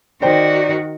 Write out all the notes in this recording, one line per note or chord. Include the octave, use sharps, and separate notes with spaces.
D#3 F#4 C5 D5 G5